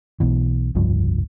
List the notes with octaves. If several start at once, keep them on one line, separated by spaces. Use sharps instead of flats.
B1 B2 E3
F1 C#2 G2 F3